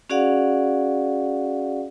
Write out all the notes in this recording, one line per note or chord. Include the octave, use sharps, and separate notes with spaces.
C#4 F#4 G#4 D5 F5 F#5